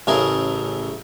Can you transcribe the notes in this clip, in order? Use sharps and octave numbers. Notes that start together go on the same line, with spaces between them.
A1 C#3 A3 G#4 A#4